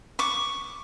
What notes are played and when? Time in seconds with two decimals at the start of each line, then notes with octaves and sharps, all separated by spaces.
0.19 C#6 D6